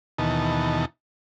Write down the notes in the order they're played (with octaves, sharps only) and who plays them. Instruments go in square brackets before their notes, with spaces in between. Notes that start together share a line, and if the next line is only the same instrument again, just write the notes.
[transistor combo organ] D#2 B2 E3 D#4 A5